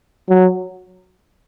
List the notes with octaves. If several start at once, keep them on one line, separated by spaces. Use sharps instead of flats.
F#3